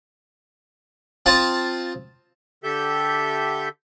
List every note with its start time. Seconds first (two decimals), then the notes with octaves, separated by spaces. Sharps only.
1.26 C4 F4 A5 D#6
2.64 D3 G4 A4 E5 G6